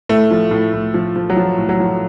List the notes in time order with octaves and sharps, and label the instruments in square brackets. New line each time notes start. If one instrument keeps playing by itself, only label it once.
[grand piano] A2 A3
F3
A2
A2
F3
F3
F#3
F3
A2
F#3
F3